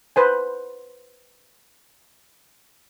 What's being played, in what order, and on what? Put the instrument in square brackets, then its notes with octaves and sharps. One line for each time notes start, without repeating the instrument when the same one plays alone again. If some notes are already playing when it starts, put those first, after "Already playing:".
[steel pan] B4 C5 G#5